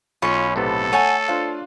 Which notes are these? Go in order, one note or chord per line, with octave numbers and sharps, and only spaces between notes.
B1 C#4 F4 C#5 B5 C6
A2 C3 B3 A4
A3 C#5 F#5 G#5 A5 D#7
D4 F4 C5 F5